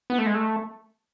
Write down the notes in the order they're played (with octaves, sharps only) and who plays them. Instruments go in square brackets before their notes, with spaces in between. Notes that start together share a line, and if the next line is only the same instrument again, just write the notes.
[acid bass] B3
A3
G#3
A3